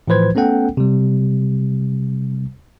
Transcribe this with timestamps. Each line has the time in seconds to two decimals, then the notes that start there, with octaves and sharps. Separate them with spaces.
0.08 A2 E3 F3 B4 C5 G#6
0.35 A3 B3 C#4 A4 F#5 G5
0.77 C3 G3